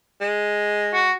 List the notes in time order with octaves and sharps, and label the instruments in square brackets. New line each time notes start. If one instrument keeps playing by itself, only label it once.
[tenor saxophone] G#3
[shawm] F#4